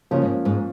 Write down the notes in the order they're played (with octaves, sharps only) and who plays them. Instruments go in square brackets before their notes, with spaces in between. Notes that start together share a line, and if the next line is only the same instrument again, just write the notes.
[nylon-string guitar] C#3 [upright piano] F3 A#3 C#4
[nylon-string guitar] G#2
G#2